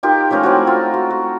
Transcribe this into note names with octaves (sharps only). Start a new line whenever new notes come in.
D#4 F4 G4 A#4
F3 A3 C#4 A#4
C4 E4 F#4
F4
F#4
F#4